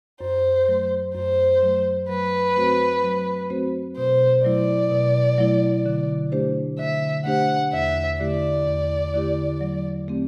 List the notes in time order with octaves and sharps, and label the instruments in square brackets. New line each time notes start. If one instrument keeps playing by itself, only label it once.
[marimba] F#2 [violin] C5
[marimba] F#3 A3
[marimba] F#2 [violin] C5
[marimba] F#3 A3
[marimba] F#3 [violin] B4
[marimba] A3 C4 F#4 C5
F#3
A3 C4 F#4 C5
[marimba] B2 [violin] C5
[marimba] F#3 A3 E4 [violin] D5
[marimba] B2
F#3 A3 E4
D3
A3 D4 G4 C5
[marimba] D3 [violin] E5
[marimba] A3 D4 G4 C5 [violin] F#5
[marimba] E2 [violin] E5
[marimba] D3 A3 E4 G4 [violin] D5
[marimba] E2
D3 A3 E4 G4
F#3
A3 C4 G4